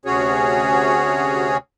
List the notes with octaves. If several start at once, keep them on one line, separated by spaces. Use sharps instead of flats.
D2 C3 C#4 F#4 G#4 C#5